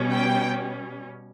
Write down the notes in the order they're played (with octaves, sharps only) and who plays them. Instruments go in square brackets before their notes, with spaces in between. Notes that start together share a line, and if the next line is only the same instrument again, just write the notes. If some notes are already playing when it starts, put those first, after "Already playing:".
Already playing: [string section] B2 G3 C#4
G5